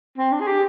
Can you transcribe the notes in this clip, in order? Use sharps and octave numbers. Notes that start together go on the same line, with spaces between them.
C4
D4
G#4
G4